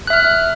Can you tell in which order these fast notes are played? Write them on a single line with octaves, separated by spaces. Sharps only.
F#6 E5 F6